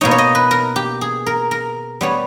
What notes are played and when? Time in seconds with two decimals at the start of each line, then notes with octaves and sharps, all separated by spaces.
0.01 B2 A#3 D#4 C#5
0.11 C#5
0.18 D#5
0.35 B4
0.51 A#4
0.76 G4
1.01 G#4
1.26 A#4
1.51 A#4
2.01 G3 B3 C#5